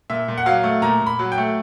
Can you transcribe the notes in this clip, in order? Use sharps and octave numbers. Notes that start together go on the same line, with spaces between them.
A#2 E5
A#2
F#5
F#3 F5
A3
A#2 A#5
A#2
B5
F#3
G5
A3